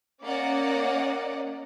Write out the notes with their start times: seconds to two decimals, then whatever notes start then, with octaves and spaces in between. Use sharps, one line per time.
0.22 A#3 C#4 D5 D#5 F#5